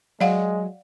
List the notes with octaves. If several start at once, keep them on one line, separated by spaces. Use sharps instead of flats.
F#3 G#3 D5 F5 F#5